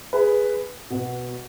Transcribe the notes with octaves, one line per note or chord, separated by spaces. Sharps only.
G#4 B4
B2 B3